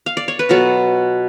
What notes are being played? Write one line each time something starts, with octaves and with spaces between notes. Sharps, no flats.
F5
D5
C#5
B4
B2 F#3 B3 F4 F#4 A4